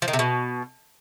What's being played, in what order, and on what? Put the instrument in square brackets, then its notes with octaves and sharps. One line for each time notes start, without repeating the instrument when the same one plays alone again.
[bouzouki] F3
D#3
C3
B2